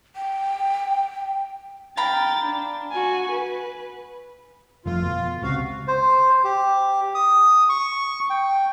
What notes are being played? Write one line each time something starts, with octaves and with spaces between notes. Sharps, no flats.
G5
F5 G5 A#5 B5 A6
D4
F#4 G#5
B4
G1 F2 A3 F4
B2
C#2 C3 F#4 F5
C5
G4
D#6
C#6
G5